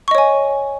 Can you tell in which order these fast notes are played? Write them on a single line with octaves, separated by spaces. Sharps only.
C#6 D#5 C#5 G#5